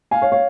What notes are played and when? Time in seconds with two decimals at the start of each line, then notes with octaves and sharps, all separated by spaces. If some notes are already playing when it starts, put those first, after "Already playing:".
0.11 F5 G#5
0.22 C#5 F5
0.32 C#5 F5